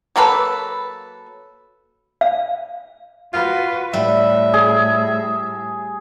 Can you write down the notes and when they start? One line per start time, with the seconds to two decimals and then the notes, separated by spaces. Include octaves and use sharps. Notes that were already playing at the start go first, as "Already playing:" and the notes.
0.16 F#3 A#3 A4 B4
2.21 F5
3.34 F4 F#4 B4
3.93 A2 G3 B4 E5
4.54 G#4